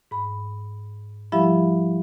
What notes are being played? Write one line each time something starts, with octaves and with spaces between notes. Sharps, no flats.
G#2 B5
F3 G3 E4 G4 E5 B5